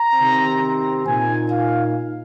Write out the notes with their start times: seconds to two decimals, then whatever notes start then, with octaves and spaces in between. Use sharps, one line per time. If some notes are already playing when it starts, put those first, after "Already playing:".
Already playing: A#5
0.14 C3 D#3 C4
1.05 A#2 A#3 D#4 G#5
1.50 F5